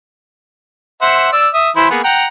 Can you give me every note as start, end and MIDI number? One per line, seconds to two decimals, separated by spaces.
1.02 1.28 72
1.02 1.28 76
1.02 1.28 78
1.33 1.48 74
1.33 1.48 88
1.54 1.70 76
1.54 1.70 87
1.76 1.88 52
1.76 1.88 64
1.76 1.88 72
1.91 2.00 58
1.91 2.00 59
1.91 2.00 68
2.04 2.26 78
2.04 2.26 79
2.04 2.26 82